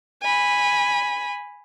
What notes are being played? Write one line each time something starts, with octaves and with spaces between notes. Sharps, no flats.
G#5 B5